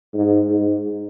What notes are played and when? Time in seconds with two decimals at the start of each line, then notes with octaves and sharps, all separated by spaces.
0.14 G#2
0.49 G#2